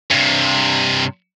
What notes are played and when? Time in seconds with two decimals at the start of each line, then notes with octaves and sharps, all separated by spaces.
0.10 G2 C3